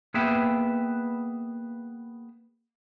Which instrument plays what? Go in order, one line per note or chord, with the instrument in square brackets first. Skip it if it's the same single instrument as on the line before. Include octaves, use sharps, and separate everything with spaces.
[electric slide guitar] A#3 B3 G#4 B4 E5 G5